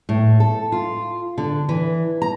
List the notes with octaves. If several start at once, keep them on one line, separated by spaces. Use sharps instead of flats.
A2
A4
F4
D3
E3
A#5